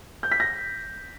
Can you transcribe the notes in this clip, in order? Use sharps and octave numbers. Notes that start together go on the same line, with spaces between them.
G6
B6
A#6